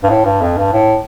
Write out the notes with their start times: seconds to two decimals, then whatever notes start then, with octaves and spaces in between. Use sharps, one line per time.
0.03 G2
0.10 A2
0.25 G2
0.42 F2
0.58 G2
0.74 A2